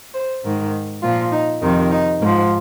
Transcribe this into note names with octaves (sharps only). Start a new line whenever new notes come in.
C5
G#2 D#3
A#2 F3 F4
D#4
F2 C3 D#3 D#4
D#4
G#2 F3 A#3